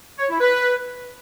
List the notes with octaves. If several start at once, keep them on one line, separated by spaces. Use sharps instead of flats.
C#5
E4
B4